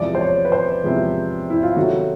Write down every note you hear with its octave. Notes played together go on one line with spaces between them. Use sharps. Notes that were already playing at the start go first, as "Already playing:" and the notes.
Already playing: E2 C3 F3 G#3 D5
C5
C#5
B4
C5
E2 C3 F3 G#3
E4
F4
C3 D#3 F#3 A3 F#4